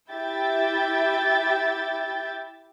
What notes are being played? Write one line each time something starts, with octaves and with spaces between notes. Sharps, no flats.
E4 G4 E5 G5 G6 A6